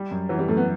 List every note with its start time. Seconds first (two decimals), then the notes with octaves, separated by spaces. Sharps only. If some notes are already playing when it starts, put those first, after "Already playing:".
Already playing: G3
0.11 F#2
0.29 E3 F#3
0.39 G3
0.48 F#2 A3
0.57 B3